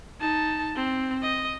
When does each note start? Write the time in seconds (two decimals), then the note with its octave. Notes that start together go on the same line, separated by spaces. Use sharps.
0.20 D#4 A5
0.76 C4
1.23 D#5